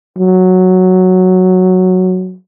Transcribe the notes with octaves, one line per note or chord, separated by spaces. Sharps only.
F#3